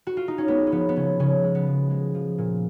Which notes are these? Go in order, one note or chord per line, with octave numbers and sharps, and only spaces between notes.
F#4
F4
D#4
C#4
G#3 B3
C#4
F3 B3
B3
C#3 C#4
C#3 C#4
G#3
B3
F3
G#3
F3
A#2